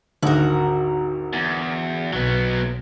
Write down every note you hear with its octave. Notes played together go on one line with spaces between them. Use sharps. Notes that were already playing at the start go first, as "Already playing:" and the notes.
G#1 D2 F#4 A#4
E2
B1 B2 F#3 B3